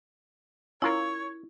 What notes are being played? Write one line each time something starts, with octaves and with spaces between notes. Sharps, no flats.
C#4 E4 F4 A#4 C#5